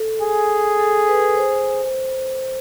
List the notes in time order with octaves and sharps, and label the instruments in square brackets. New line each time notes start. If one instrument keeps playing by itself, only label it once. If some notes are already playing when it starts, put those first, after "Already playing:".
Already playing: [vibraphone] A4
[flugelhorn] G#4
[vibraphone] A4
B4
C5